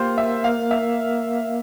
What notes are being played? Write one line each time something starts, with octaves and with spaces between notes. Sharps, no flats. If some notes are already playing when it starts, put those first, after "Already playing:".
Already playing: A#3 F4 G4 C5
E5
F5
E5